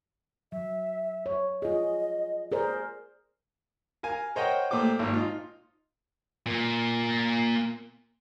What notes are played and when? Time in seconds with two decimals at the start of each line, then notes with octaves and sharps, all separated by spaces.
0.52 F#3 E5
1.26 C#5
1.62 F4 G#4 D#5
2.52 G#4 A#4 C5 D5
4.03 A#4 F5 G#5
4.36 A#4 C5 C#5 D#5 F#5 G5
4.71 A#2 A3 C5 G5 D6
4.99 G#1 A#2
5.14 D#4 F4
6.46 A#2 A#3